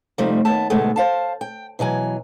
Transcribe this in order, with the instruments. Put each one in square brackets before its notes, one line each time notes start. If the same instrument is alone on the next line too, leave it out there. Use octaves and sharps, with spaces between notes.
[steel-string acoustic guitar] C3 F3 G3 A3 C4 D#4
D#2 B3 A5
D2 G#2 B2 G#3 A3 B3
C5 F5 A5
G5
B2 E3 F#3 G#5